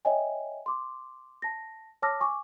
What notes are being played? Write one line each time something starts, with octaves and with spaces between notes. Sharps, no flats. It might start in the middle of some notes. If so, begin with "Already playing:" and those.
C#5 D#5 E5 G5 G#5
C6 D6
A5 A#6
C#5 A5 D6 E6 F6 A#6
G#5 C#6 D6